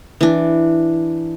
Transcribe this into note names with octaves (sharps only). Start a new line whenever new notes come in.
E3 D4